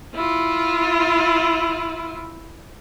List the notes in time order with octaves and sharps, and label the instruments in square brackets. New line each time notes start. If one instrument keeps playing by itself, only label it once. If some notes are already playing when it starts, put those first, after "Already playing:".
[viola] E4 F4